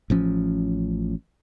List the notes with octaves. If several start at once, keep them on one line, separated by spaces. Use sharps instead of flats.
A1 F3 C#4